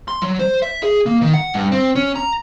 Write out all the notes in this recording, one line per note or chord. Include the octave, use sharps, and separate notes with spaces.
C6
F#3
C5
E5
G#4
A#3
D#3
F#5
G2
C4
C#4
A#5